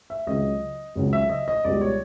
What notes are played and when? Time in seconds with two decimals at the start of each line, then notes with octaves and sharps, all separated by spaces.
0.10 E5
0.27 C#2 C#3 F#3 D#5
0.96 C#2 C#3 F#3
1.13 E5
1.29 D#5
1.48 D#5
1.64 C#2 B2 G3 D5
1.81 C#5